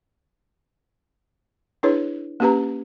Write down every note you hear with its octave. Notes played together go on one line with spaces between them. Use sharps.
D4 E4 G#4 B4 C#5
A#3 C#4 G4 B4 A#5